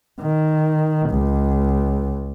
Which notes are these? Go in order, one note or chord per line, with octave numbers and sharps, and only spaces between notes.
D#3
C#2